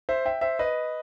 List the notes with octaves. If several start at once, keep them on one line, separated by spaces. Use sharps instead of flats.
C5 E5
E5 G5
C5 E5
B4 D#5